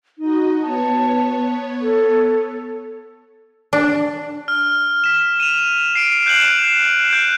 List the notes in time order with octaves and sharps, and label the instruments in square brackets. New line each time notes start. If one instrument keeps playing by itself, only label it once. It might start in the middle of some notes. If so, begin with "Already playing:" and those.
[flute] D#4 [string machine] F#4 D#5
[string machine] B3 C#5 [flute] A5
[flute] A4
[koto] D4
[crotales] F6
B6 E7
D#7 F7
C7 D7
F#6 G6 E7 F#7
F#6 G6 D7